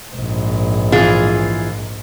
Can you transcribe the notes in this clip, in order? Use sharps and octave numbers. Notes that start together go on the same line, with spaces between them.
A#1 G#2
E3 F4 G#4